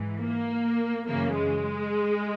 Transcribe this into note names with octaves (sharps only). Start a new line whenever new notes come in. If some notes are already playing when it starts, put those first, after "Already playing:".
Already playing: G#2 E3
A#3
F#2 C#3 E3 A#3
G#3